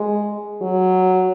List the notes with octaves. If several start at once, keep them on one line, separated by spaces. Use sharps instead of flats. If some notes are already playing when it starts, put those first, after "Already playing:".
Already playing: G#3
F#3